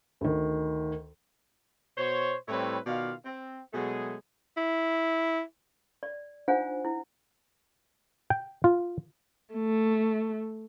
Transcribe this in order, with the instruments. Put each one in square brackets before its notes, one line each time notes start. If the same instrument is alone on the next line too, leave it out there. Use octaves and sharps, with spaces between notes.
[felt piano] D2 D#3
[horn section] B2 C5 C#5
A2 G3 C4 E4 B4 C#5
B2 D#3 F4 D5 F5
C4
B2 F#3 G#3 A3 G#4
[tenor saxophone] E4
[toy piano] D5
D4 D#4 F4 C5 F#5 G#5
E4
[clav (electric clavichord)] G5
F4
[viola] A3